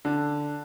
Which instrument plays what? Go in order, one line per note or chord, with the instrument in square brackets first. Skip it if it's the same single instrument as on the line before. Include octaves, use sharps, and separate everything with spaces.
[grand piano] D3